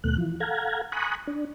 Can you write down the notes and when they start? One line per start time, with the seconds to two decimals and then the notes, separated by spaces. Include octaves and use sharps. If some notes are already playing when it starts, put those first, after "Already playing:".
0.04 D#2 B2 A3 F#6
0.18 E3 F3
0.40 A4 F5 F#5 A#5 G#6
0.92 G#5 A#5 B5 C#6 D#6 F#6
1.27 D4